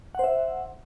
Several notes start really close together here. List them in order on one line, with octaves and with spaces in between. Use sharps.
F#5 C5 E5